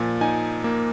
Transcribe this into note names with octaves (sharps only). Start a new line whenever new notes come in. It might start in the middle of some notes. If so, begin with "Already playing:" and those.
Already playing: A#2 F3
D#4 G#5
A#3